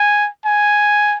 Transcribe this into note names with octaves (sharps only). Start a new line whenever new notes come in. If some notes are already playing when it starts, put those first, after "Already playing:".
Already playing: G#5
G#5